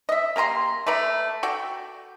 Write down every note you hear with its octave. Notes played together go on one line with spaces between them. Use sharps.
D#5 E5
A#3 G4 A#5 C6
A3 B4 D5 A#5
F#4 A4 D5 G5